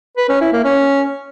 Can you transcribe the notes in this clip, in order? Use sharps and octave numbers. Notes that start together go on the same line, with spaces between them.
B4
C#4
E4
A#3
C#4